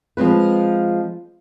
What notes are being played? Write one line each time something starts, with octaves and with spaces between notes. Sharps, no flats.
F3 G#3 C4 B4